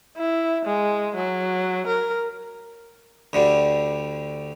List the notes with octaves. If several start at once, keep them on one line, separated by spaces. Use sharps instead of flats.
E4
G#3
F#3
A#4
D2 D3 G3